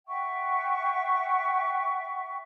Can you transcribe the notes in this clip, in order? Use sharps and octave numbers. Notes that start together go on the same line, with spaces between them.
E5 F#5 G5 C#6